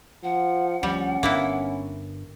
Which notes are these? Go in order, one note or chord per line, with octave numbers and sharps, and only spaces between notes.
F3 F#5
D2 F3 G3 C#4
G1 A#3 B3 D4 E4